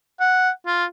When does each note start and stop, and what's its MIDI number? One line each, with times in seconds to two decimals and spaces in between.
0.20 0.50 78
0.67 0.85 65